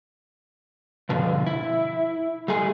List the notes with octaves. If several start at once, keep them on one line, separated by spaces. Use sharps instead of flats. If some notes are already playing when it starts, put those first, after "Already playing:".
G2 B2 D3 F3
E4
G3 A3 G#4